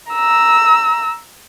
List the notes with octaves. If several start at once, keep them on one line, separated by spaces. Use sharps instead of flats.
A#5 E6